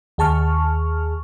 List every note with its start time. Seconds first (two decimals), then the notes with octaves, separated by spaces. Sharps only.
0.18 D#2 G#4 A5 C#6 F6